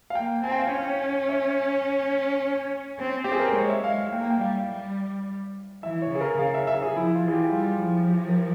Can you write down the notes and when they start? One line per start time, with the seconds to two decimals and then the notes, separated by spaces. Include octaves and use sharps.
0.10 F5
0.15 A#3 G5
0.44 C4 G#5
0.51 G5
0.59 F5
0.67 G5
0.73 C#4
1.29 E5
2.99 C4
3.24 G4
3.28 C4 G#4
3.40 A#4
3.48 C5
3.56 G#3 C#5
3.70 E5
3.84 G#3 F5
3.98 F5
4.12 A#3 G5
4.30 G5
4.41 G3 F5
4.70 G3
5.83 E3 E5
6.02 C#5
6.11 C#3 G#4
6.21 A#4
6.39 C#3 F5
6.54 E5
6.67 E5
6.82 G#4
6.96 F3 E4
7.15 F4
7.25 E3 G#4
7.33 G4
7.48 E4
7.53 G3 F4
7.81 F3 E4
8.09 G4
8.29 A#4